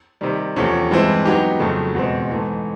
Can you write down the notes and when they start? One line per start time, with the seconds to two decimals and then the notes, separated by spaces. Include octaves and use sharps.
0.21 C3 D#3 G3
0.56 E2 C3 F3 A3 C#4
0.91 G2 E3 G#3 C4 E4
1.25 F#3 B3 D#4 G4
1.60 F2 C#3 F#3 A3
1.95 E2 B2 G#3 C4
2.30 G#2 E3 A3